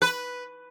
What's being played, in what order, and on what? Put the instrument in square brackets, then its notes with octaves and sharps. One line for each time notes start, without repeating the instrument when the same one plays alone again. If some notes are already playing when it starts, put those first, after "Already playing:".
[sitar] B4